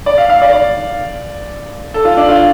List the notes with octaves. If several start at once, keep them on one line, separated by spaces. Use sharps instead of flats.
D5
F5
F5
D5
D5
A4
F4
D4
F4